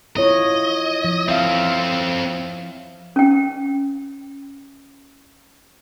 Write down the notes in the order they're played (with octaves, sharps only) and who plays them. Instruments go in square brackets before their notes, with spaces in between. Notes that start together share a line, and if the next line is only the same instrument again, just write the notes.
[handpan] E4 F4 C#5 [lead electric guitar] D#5
[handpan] F3
[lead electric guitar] C4 A4 [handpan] E5 F5
[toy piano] C#4 G5